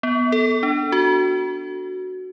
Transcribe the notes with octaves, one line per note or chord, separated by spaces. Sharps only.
B3
A4
D4
F#4